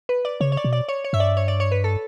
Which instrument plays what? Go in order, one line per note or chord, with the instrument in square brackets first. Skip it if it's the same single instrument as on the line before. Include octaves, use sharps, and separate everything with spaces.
[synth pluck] B4
D5
[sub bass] C#3 [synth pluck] C#5
[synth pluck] C#5
D5
[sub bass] B2
[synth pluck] D5
C#5
C#5
[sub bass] G2 [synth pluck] E5
[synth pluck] D5
C#5
D5
C#5
B4
A4